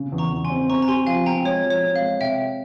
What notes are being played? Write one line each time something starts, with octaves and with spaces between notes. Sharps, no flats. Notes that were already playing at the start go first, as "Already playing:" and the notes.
Already playing: C#3
E2
A#5 C#6
E2
G#5 C6
C4
C4 A#5 C#6
A#5
G4 G#5 C6
F3 F5 G#5
C4 G5 A#5
G#3 C#5
F3
C#5
C4
F5
G#3
C3 E5 G5